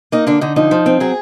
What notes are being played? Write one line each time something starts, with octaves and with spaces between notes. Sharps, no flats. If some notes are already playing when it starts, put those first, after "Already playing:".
A#3 D#4
D3 D4
D3 D#4
F3 D#4
F3
C4
F#3 G#4